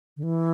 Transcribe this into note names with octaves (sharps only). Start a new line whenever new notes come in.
D3
E3